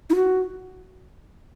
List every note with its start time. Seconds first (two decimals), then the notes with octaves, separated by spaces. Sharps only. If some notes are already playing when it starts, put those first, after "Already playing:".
0.10 E4
0.15 F#4